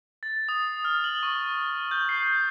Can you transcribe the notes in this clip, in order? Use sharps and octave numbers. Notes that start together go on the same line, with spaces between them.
A6
D#6
F6
F#7
C#6
G6
C7